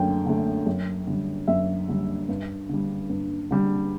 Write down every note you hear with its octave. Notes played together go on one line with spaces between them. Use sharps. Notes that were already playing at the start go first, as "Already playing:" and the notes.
Already playing: F#2 D3 A3 G5
D3 A3
F#2
D3 G3
F#2 E5
D3 G3
G2
D3 G3
G2
D3 G3